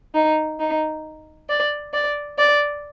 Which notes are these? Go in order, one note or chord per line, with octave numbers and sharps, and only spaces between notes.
D#4
D#4
D5
D5
D5